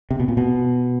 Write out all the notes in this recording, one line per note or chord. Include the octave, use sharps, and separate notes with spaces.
C3
B2
A#2
B2